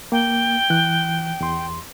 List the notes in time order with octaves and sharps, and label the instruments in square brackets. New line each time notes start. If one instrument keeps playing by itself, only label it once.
[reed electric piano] A#3 [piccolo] G5
[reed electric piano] E3 F#6
E2 C6